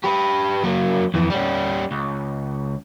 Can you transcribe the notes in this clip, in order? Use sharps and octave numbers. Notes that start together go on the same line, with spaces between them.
G4 B4
F#3 A#3
F2 E3
G3 C#4
C#2